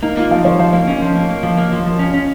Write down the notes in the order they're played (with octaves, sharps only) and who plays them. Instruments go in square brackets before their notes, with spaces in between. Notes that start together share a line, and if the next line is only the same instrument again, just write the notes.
[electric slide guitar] A#3 [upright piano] D#4
[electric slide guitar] A#3 [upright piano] F4
[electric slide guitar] F3 [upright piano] F5
[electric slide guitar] F3 [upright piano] C#5
[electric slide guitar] F3 [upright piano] F5
[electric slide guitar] A#3
C#4
F3
A#3
A#3
F3
A#3
F3
F3
C#4
C#4